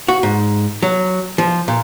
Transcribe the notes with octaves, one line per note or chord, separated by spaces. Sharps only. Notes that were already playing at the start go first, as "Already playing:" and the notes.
F#4
G#2
F#3
F3
A#2